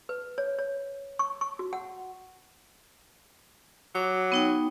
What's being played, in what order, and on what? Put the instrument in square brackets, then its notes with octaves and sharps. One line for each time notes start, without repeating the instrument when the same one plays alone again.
[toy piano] B4
C#5
C#5
C#6
C#6
F#4
F#5
[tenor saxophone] F#3 [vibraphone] D6
[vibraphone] B3 D#4 G5